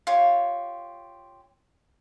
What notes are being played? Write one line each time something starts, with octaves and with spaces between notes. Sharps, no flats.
F4 G4 C#5